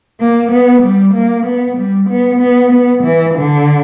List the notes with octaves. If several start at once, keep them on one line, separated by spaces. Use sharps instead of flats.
A#3
B3
G3
A#3
B3
G3
B3
B3
B3
E3
D3